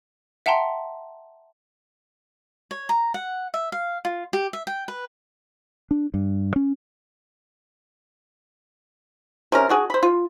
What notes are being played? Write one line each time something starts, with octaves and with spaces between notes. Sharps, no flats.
E5 F#5 G5 A5 A#5 C6
C#5
A#5
F#5
E5
F5
F4
G4
E5
G5
B4
D4
G2
C#4
C3 C#4 A#4
D4 F#4 G#4
C5 B5
F4